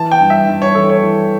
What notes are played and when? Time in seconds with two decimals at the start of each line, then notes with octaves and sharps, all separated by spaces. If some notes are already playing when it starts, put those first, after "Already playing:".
Already playing: E3 A5
0.12 G5
0.21 G2
0.30 E5
0.48 G2
0.62 C#5
0.75 E3 A4
0.90 C#5
1.03 E3